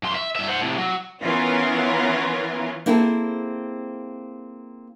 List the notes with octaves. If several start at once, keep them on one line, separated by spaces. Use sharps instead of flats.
F#2 C6
E5
G2 E5
C5 F#5
A2 C3
F#3
E3 B3 C#4 F4 A#4
A#3 C4 E4 G#4 A4